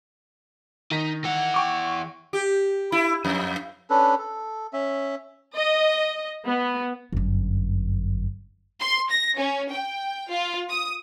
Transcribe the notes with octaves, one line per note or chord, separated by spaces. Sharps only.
D#3 D#4 B6
E3 F#5
G5 C#6 D6
G4
E4
F2
C#4 D4 A4 B4
A4
C#4 E5
D#5
B3
G1 F#2
C6
A#6
C#4
G5
F4
D#6